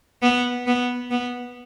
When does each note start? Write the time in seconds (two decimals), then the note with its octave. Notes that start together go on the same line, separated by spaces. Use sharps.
0.23 B3
0.67 B3
1.11 B3